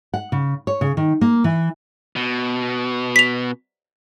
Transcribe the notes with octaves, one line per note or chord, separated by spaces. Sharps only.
F#5
C#3
C#5
C#3
D#3
A#3
E3
B2
B6 F7